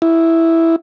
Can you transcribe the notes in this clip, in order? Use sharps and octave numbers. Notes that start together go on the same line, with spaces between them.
E4